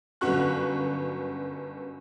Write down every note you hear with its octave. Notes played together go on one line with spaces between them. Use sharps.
G1 F#2 F#4 C#6 F#6